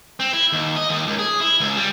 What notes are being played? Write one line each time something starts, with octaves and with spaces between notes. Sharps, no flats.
C4
E4
D#2
D#5
D#2
C#2
G#4
E4
C#2
G3